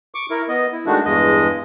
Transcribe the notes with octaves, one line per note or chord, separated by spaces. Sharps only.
C#6 D6
E4 A#4
B3 D#5
E4
D#3 G#3 A3 D4 F#4
E2 G2 G#3 D#5